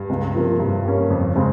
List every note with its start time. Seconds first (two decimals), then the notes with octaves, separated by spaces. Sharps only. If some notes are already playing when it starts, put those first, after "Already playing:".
Already playing: G2
0.09 C#2
0.35 C3 F3 A#3 F4
0.60 G2 C3
0.85 G3 A#3 C#4
1.10 F2
1.36 C#3 G#3 C4